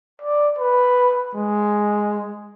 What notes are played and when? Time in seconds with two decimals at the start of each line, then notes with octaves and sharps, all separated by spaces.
0.22 D5
0.58 B4
1.34 G#3